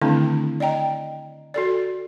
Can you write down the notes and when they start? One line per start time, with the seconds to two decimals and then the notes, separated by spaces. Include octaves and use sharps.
0.01 D3 D#3 A3 C4 D4 E4
0.60 D5 D#5 G5 A#5
1.54 F#4 A4 D5